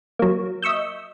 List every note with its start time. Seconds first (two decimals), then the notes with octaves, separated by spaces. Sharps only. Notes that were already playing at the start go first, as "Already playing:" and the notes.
0.19 F#3 A#3
0.62 D#5 E5 C#6 E6 G6